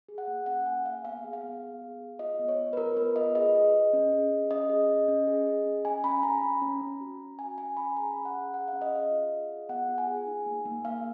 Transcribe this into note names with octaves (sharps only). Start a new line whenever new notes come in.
G#4
F#5
A#3
C#4 F#5
A#3 G#5
A#3 F5
B3 F5
G#4
F5
B3
B3
G#4
G#4
F4 D#5
B3
C#5
B3
B4
F4 A#4
B3 B4
F4 D#5
G#4 D#5
G#4
G#4
C#4
G#4
C#4
C#4 D#5
G#4
C#4
C#4
G#4
G#4
C#4
C#4 G#5
C#4 B5
C#4 A#5
C#4
C#4
C#4
F#4
C#4
C#4 G#5
C#4 G#5
C#4 B5
G#4 A#5
C#4
F#5
G#4
G#4 F#5
F5
C#4
D#5
G#4 F5
F4
G#4
G#4
B3 F#5
F4
G#5
G#4
D#4
A#3
A#3
A#3 F5